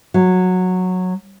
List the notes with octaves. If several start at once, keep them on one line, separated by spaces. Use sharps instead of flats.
F#3